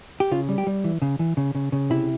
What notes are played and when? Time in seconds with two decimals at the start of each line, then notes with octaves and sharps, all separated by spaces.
0.20 G4
0.31 C#3 F4
0.49 G3
0.58 G4
0.67 G3
0.84 E3
1.02 C#3
1.19 E3
1.37 C#3
1.55 C#3
1.72 C#3
1.90 C3 E4